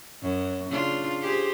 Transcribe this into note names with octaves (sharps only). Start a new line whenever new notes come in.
F#2
C#3 D4 F4
G4 G#4 C5